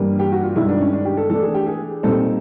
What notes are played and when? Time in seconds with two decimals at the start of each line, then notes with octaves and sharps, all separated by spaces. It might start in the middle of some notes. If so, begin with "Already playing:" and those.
Already playing: G2 E3 G3 A#3 D4
0.19 G4
0.32 F#4
0.43 F4
0.56 G2 D#3 G#3 E4
0.69 D4
0.81 C#4
0.93 D4
1.05 G4
1.17 A4
1.29 E3 A3 D4 A4
1.42 G#4
1.54 G4
1.66 G#4
2.03 A#2 G3 C4 D#4 A4